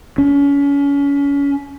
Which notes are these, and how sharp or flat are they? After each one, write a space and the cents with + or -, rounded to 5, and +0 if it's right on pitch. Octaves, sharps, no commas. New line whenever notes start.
C#4 +30